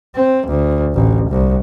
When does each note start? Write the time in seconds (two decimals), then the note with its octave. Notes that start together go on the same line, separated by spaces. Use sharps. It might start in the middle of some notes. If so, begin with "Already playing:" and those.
0.16 C4
0.47 D2
0.94 A1
1.30 C2